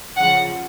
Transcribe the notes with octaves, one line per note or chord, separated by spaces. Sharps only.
C#3 F3 F#5